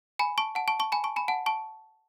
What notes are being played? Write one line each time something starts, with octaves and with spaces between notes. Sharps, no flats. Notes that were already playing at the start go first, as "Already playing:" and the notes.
G#5 B5
A5 C#6
F#5 A5
A5 C#6
A5 C#6
G#5 B5
A5 C#6
G#5 B5
F#5 A5
A5 C#6